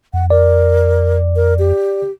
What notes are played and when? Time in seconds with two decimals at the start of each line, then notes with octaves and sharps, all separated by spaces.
0.13 F2 F#5
0.30 A#4 D5
1.36 A#4
1.59 G4